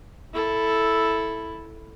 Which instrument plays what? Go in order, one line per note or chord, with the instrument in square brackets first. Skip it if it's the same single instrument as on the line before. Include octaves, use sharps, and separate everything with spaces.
[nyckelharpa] E4 A4